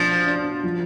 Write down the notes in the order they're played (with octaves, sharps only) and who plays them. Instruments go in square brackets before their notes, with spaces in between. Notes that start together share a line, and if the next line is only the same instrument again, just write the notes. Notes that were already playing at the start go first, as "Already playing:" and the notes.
Already playing: [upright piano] B2 D4 [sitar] F3
[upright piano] D4
F3